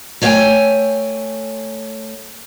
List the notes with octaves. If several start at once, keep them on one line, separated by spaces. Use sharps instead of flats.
A3 C#5 E5 F5 G5 G#5